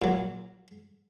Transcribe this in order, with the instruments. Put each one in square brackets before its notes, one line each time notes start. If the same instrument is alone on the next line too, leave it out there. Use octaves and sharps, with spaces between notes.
[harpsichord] A#2 F#3